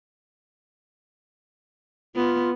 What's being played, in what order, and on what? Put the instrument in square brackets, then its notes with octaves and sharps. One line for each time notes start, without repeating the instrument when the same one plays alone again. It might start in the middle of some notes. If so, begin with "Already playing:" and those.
[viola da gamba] B3 [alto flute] F4